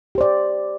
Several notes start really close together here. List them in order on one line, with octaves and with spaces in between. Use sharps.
G4 C5 D5